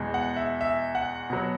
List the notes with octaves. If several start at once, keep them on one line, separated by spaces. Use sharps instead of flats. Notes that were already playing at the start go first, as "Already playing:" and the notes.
Already playing: E2 B2 G#3
F#5
E5
E5
F#5
B2 F#3